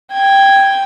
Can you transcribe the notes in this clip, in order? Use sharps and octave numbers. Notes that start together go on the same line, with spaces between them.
G5 G#6